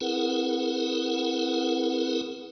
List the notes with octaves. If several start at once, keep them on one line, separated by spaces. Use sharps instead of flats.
C4 E4 G#4 A#4 B4 F#5